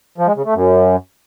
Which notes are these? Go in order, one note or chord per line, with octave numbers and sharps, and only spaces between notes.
F3
G#3
C#3
A3
F#2